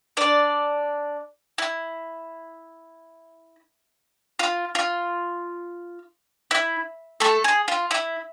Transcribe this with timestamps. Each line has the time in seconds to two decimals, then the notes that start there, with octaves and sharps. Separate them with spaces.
0.17 D4 D5
1.58 E4
4.39 F4
4.75 F4
6.51 E4
7.20 A3 A4
7.44 G#4
7.68 F4
7.91 E4